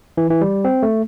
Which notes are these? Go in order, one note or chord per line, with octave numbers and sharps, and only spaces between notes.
E3
E3
G3
C4
A3